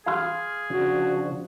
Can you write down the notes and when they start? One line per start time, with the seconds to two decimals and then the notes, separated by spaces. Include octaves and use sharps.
0.06 G#4 F5 C6 F6
0.70 C#3 F3 D4 F#4